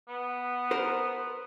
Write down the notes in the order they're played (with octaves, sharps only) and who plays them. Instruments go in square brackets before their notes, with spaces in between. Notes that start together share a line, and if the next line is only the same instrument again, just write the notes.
[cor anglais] B3
[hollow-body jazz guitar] A#4 C5